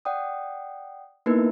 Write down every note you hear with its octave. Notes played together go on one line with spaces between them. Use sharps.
D5 F#5 G5 D#6
A#3 B3 D#4 E4 A#4 B4